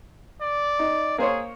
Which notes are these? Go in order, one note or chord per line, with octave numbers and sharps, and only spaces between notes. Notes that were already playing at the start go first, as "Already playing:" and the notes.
D5
D#4
A#3 G#4 C5 C#5